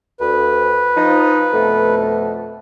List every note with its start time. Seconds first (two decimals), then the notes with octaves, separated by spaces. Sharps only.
0.20 D2 B4
0.97 F3 D#4
1.53 F2 B2 A3